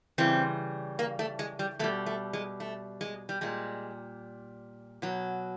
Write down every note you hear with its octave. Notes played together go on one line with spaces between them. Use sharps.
C#3 E3 G3 C4
A#3
A3
G#3
G3
B2 G3 A3
A3
G#3
A3
G#3
G3
A#2 G3 G#3
B2 F#3